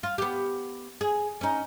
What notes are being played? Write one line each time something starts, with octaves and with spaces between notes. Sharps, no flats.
F4
B3 G4
G#4
C#4 D#4